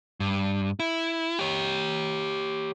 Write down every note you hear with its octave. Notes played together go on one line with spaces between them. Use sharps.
G2
E4
G4 C#5